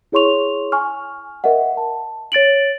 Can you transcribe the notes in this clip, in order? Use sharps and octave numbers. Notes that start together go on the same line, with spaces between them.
E4 G#4 C#5 C6 C#6 F7
G#5 C#6 F6
A#4 D#5 E5 F#5
A5
C#5 A6 D7 F#7